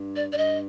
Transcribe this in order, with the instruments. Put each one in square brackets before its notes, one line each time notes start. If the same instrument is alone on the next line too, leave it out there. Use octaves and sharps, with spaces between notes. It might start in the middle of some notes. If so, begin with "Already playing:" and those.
Already playing: [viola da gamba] G2
[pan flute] D5
D5
[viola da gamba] G2 [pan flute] D#5